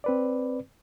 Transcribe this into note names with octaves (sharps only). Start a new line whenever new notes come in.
C4 B4 D5